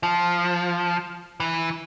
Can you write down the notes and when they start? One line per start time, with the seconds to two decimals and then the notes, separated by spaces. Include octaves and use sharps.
0.03 F3
1.40 E3